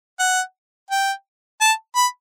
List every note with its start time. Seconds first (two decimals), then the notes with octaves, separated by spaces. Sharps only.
0.19 F#5
0.90 G5
1.61 A5
1.96 B5